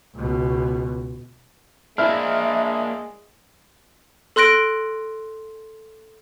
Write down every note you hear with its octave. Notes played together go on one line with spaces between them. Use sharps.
C#2 B2
G#3 A#3 D4 E4 E5 F6
A4 C6 F#6 A#6 D7